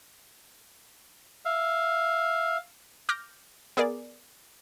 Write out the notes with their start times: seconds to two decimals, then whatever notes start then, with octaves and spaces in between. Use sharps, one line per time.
1.45 E5 F5
3.09 D6 F6 G6 A#6
3.77 B3 G#4 A#4 D5